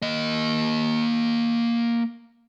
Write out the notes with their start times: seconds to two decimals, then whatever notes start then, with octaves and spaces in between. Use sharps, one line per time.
0.02 A#3 D#5